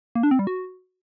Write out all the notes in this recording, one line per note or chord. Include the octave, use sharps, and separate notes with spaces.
A#3
D4
C4
G3
F#4